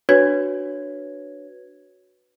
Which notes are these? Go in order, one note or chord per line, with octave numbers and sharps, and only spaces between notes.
D4 F#4 B4 C#5 G#6